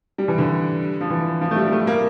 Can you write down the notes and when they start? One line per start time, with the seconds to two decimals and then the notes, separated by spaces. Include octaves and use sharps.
0.18 G3
0.28 E3
0.38 D3
1.01 F3
1.10 E3
1.41 F3
1.51 A3
1.56 G3
1.66 G3
1.72 A3
1.87 A#3